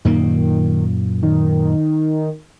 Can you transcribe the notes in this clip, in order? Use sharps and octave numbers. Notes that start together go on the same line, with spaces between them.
F#2 A#2 D#3 A#3
D#3